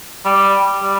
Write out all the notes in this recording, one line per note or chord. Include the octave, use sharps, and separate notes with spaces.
G3
G3